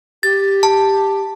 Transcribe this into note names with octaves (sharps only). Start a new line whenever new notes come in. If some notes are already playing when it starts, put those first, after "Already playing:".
G4 A6
A5